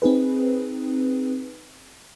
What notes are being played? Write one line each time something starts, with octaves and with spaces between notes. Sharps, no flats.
C4 D#4 G#4 B4